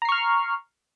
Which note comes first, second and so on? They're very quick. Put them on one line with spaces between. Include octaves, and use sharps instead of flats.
A#5 C7 C#6 F6